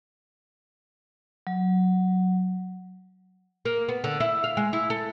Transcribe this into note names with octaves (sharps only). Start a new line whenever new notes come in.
F#3
A#3
B3
D3
E4
F5
G#3
E4
A4